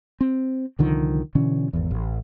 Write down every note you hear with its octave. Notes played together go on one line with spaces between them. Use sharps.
C4
C2 D3 D#3 F3
B2 D3 E3 C#4
G#1 E2
A1